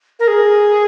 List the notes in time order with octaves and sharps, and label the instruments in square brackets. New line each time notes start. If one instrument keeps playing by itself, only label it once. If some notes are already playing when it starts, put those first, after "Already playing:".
[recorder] A#4
G#4